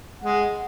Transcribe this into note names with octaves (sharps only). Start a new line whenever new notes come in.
G#3 F#5